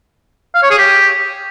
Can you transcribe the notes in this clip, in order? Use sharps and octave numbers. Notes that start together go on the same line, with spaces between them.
F5
C#5
G#4
G4